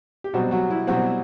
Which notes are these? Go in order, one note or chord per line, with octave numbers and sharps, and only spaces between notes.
G4
B2 F#3 G3 C4 F#4
F#3 F#4
E4
B2 F#3 G3 C4 F#4